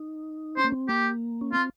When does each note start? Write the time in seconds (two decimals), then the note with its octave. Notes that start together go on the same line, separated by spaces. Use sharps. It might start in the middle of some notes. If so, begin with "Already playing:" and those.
Already playing: D#4
0.57 C#4 C5
0.64 A#3
0.72 C4
0.88 A#3 G4
1.41 C#4
1.53 C4 F4